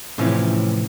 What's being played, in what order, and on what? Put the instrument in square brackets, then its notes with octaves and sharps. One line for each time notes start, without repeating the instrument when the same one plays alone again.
[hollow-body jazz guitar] A2 C3 E3 F3 C#4